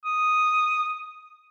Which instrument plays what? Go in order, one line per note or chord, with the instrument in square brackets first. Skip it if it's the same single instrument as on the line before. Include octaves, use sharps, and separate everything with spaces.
[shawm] D#6